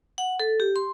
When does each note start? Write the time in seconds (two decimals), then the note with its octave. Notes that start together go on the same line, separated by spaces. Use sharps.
0.18 F#5
0.40 A4
0.60 G4
0.76 C6